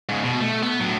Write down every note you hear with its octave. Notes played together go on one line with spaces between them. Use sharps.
G#2 C#3
B2
A3
B3
A2 F#3